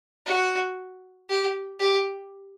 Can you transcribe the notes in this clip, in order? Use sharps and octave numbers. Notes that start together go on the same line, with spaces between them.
F#4
G4
G4